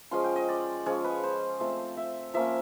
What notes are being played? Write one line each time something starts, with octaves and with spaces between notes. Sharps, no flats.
F3 G#3 C#4 F4 C6
G5
D#5
D5
F3 G#3 C#4 C#5
B4
C5
A3 C4 F4
E5
F3 A#3 C#4 E5